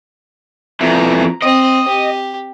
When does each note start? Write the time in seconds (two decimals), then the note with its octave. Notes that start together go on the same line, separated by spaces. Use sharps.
0.81 F2 E3 A#5
1.42 C4 D#5
1.87 G4